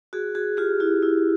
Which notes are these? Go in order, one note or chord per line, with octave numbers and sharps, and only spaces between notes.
F#4 G#4
F#4 G#4
F4 G4
E4 F#4
E4